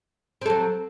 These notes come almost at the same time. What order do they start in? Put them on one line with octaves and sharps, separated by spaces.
C4 A4 F#3